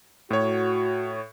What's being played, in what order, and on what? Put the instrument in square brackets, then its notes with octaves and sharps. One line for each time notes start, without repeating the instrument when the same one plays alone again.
[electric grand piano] A2 C#5 [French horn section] F#4